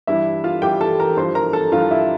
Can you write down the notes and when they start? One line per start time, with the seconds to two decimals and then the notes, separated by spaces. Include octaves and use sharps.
0.07 G2 E3 G3 E4 E5
0.44 F4 F5
0.62 G2 E3 G3 G4 G5
0.81 A4 A5
1.00 A#4 A#5
1.17 G2 F3 C5 C6
1.35 A#4 A#5
1.53 A4 A5
1.72 G2 F3 F4 F5
1.91 E4 E5